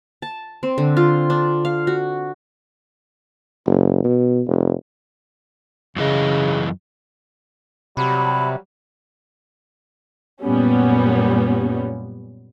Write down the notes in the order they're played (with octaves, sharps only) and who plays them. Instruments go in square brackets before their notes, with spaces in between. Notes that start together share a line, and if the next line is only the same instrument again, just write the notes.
[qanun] A5
C4
D3
F4
D4
F5
F#4
[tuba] F#1
B2
F1
[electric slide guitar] F#2 E3 D#5 [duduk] C#3
[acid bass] C3 [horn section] F#3 G3 [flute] B5
[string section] F#2 A#2 G3 B3 C#4